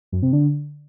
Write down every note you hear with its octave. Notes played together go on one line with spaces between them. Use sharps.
F#2
C3
D3